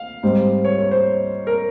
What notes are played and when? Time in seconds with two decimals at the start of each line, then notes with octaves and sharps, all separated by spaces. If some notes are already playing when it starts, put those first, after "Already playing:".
Already playing: F5
0.23 G#2 G3 C4
0.64 C#5
0.78 C#5
0.91 C5
1.47 A#4